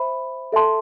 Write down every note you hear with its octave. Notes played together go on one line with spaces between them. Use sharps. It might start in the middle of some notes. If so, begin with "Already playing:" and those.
Already playing: C5 E5 B5
A4 E5 A5 C6